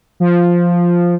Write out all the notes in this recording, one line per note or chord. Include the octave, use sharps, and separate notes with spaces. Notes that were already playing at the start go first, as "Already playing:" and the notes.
F3